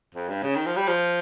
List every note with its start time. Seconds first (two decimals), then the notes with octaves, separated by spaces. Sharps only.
0.15 F2
0.29 G2
0.43 C#3
0.56 D#3
0.66 F3
0.76 G3
0.88 F3